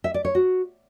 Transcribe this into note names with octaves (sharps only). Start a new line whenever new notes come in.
E5
D5
C#5
F#4